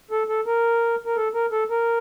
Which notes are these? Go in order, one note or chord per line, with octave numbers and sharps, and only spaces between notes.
A4
A4
A#4
A#4
A4
A#4
A4
A#4